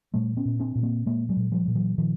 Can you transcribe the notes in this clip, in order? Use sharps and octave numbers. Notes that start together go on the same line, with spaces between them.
A#2 G3 A3
B3 C#4
A#2
C4 D4
A#2
A#3 C4
A#2 G#3 A#3
F#3 G#3
A#2
F3 G3
A#2 G3
E3 F#3
A#2 D#3 F3